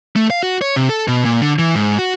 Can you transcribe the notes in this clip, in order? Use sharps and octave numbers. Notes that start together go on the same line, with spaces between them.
A3
F5
F#4
C#5
C3
A4
B2
A#2
D3
E3
G#2
F#4